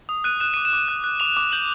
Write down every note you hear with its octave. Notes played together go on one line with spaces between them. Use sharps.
D#6
F#6 D#7
F#6 E7
D6 D#7
E7
D6
F#6
F#6
D6 F7
D6
G6 F#7